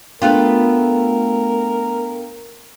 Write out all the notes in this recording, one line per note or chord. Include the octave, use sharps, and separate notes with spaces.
A3 B3 D4 F4 A#4 F5 G5